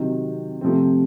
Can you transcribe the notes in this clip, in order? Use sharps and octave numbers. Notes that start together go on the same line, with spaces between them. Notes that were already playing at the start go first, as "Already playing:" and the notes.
Already playing: C3 D#3 F#3 C4
C3 F3 A3 C4